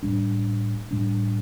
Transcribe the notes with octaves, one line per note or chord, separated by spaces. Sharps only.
A2 G3 D4
A2 G3 D4